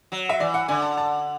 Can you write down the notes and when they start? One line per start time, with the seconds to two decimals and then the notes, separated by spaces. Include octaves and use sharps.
0.12 F#3
0.29 E5
0.40 E3 D5
0.54 F#5
0.68 D3 G#5
0.82 A5
0.97 A5